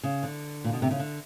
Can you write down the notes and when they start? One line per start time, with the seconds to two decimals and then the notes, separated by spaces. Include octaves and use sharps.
0.03 C#3
0.23 D3
0.64 A#2
0.73 B2
0.82 C3
0.91 C#3
0.99 D3